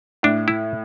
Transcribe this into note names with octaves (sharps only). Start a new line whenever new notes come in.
A2 D4
E4